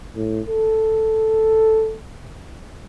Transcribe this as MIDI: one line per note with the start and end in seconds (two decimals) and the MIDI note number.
0.16 0.41 45
0.47 1.96 69